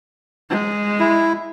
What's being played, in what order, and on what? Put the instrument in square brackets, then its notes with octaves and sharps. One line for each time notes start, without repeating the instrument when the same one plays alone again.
[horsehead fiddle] G#3
[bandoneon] E4